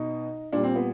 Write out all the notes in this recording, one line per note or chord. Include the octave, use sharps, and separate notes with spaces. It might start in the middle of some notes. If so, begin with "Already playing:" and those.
Already playing: B2 D#4
A#2 G3 D4
C4
B3